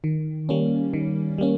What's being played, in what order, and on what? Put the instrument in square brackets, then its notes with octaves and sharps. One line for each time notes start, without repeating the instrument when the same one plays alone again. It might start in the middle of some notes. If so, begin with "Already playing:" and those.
[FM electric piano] D#3
G3 A#3 C#4
D#3
G3 A#3 C#4